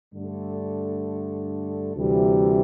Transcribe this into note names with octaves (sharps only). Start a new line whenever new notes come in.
G2 D3 A3 D4 A4
D2 C3 E3 G3